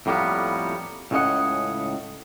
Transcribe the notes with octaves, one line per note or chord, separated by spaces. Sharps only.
F2 A2 G3 A#3 B3
C#2 A2 C#3 C#4 D#5 F#5